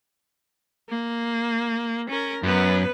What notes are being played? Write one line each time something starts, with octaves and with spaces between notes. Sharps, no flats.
A#3
C#4 A#4
F#2 B3 B4